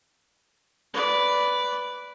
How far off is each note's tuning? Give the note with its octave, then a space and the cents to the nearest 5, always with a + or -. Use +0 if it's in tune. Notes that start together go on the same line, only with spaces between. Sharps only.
B4 +0 D5 -15